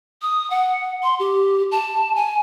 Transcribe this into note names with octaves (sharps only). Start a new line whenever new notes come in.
D#6
F#5
C6
G4
A5
G#5